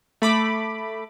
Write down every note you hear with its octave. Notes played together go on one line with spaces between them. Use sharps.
A3 B5 D6